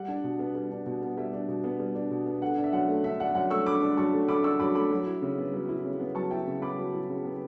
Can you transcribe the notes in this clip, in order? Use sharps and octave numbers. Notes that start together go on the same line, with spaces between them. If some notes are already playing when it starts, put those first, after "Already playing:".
Already playing: G3 F#5
D4
B2
B3
G3
D4
B2
B3
G3 E5
D4
B2
B3
G3
D4
B2
B3
D3 F#5
D4
E5
F#2 F#5
A3
D3 E5
D4 F#5
F#2 F#5
A3 C#6 E6
D3 B5 D6
D4
F#2 A5 C#6
A3
D3 B5 D6
D4 C#6 E6
F#2 B5 D6
A3 B5 D6
F#3
E4
C#3
B3
F#3
E4
C#3
B3
F#3 A5 C#6
E4 E5 G5
C#3
B3 B5 D6
F#3
E4
C#3
B3